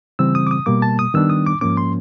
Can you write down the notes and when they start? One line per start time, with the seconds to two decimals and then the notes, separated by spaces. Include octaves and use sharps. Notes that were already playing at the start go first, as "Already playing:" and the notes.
0.19 C#3 E3 G3 C4 E6
0.35 D#6
0.47 D6
0.51 D#6
0.66 B2 G3 A#3 D6
0.82 A5
0.99 D#6
1.14 D#3 G3 B3 D4 E6
1.30 D#6
1.47 D6
1.61 G#2 F3 A#3 C#4 D6
1.77 C6